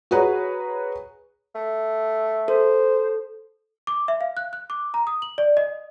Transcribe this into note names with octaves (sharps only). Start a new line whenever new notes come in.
F#4 G#4 B4 C#5 A#5
A3
A4 C5
D6
E5
F5
F#6
F#6
D6
A#5
D#6
F#7
D5
D#5